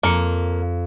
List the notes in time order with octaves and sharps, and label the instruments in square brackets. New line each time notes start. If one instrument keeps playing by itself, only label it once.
[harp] F2 C#7 [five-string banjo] A#3